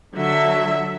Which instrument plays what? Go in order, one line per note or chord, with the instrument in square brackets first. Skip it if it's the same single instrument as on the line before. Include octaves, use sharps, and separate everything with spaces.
[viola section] D3 F#3 E5